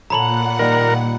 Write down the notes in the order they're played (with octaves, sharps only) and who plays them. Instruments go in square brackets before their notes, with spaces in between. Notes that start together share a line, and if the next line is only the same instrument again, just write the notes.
[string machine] A#2 F#5 [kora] A4 C#5 E5 [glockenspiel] A#5 B5 F#7
[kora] D#3 G3 A#3 [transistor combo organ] A#4